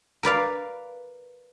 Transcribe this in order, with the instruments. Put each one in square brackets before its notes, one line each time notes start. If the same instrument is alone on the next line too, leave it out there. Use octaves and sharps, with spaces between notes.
[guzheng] A#4 B4 D5 F5